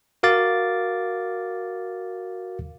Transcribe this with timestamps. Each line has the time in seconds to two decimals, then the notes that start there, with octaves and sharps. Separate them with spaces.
0.23 F#4 A#4 F5 D6 A6